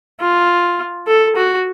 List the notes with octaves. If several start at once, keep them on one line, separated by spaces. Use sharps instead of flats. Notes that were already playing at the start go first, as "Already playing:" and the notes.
F4
A4
F#4